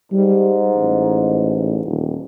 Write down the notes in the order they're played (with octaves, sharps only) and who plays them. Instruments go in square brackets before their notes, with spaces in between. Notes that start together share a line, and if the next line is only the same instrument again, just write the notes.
[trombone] G#2 [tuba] G3
[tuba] A1
D#1